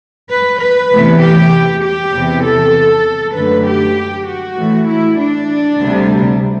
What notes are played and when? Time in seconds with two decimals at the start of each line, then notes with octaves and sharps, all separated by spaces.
0.30 B4
0.61 B4
0.92 E2 C3 E3 A3
1.22 G4
1.83 G4
2.13 E2 C3 E3
2.45 A4
3.36 F#2 D3 F#3 A3 B4
3.67 G4
4.28 F#4
4.57 A2 E3 A3
4.89 E4
5.19 D4
5.80 D2 C3 G3